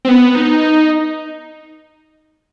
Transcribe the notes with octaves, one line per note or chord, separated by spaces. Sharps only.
C4
B3
D#4